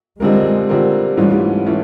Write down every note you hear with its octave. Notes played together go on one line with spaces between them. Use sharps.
D3 G3 G#3 C4 F4 A#4
D3 G3 C4 F4 A#4
G#2 E3 G3 A3 C#4 F4
E3 A3 C#4 F4